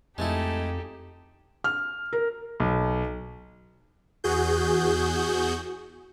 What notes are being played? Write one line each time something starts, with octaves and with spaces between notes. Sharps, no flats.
F2 G#3 A3 D#4 E4 G4 A4
F6
A#4
B1
E2 F#4 G#4 G6